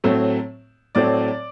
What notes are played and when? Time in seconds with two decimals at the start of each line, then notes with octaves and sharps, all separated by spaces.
0.04 A2 F#3 A3 C4
0.95 A2 F#3 A3 C4 D5